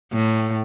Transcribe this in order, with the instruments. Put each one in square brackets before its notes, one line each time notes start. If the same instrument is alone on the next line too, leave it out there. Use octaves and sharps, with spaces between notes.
[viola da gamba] A2